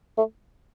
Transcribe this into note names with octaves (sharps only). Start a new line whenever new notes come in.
A3